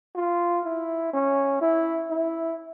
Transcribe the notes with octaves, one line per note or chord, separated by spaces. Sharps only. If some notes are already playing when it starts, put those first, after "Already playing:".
F4
E4
C#4
E4
E4